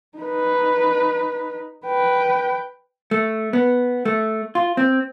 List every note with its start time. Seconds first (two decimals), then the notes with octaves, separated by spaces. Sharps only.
0.18 D#4 B4
1.86 B4 G5
3.11 A3
3.53 B3
4.05 A3
4.55 F4
4.77 C4